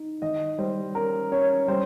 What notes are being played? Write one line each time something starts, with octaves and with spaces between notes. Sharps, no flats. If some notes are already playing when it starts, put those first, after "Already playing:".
Already playing: D#4
D#3 D#5
G3 C5
C#4 A#4
C#4 C#5
G3 C5